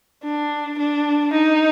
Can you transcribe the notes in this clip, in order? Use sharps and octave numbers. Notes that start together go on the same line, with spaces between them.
D4
D4
D#4